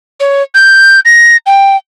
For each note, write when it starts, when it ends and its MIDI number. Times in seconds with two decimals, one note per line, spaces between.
0.20 0.42 73
0.55 1.00 91
1.05 1.37 94
1.46 1.76 79